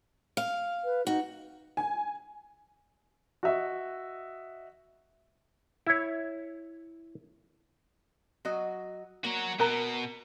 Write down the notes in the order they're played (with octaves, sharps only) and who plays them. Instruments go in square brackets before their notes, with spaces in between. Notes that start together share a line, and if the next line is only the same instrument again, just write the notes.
[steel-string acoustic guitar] F5
[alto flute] B4
[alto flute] D#4 [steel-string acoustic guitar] F#4
[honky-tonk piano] G#5
[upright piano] F#4 D#5 E5
[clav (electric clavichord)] E4 C#5
[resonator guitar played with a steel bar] F#3 F#4 D#5
[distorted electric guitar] F#3 F#4 [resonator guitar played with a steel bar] A#3
[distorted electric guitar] B2 [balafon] A#4 A#5